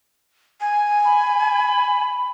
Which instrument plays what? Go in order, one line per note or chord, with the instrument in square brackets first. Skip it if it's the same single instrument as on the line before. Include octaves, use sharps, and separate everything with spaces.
[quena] G#5
[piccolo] B5